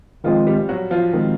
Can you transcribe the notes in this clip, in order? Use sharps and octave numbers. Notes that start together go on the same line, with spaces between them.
D#3 F3 G#3 C4 F4
G3 G4
F#3 F#4
F3 F4
D#3 G#3 C4